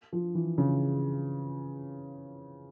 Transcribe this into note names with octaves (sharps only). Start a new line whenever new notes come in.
F3
E3
C#3